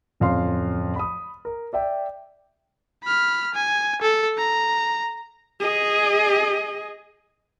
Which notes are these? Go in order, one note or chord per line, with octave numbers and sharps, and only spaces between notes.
D1 F2 C#4 F5 C6
B5 D#6
A#4
D5 E5 G5
B5 F6
G#5
A4
A#5
G#4 D#5